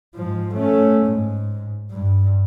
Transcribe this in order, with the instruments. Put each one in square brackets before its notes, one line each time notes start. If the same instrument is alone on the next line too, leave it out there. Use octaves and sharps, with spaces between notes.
[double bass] G#2 F3
A3 C#4
G#2
G2